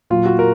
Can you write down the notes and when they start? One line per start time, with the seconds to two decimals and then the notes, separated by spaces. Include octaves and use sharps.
0.10 A#2 F#3 F4
0.26 F#4
0.39 A#4